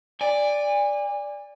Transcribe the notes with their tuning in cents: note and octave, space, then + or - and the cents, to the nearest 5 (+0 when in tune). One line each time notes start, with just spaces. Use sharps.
D5 +0 G#5 -30